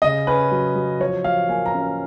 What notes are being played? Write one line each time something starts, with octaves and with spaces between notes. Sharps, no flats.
C#3 D#5
C#4 B4
F#3
F#3
F3 C#5
F3 F5
A#3 G#5
A#5
C#4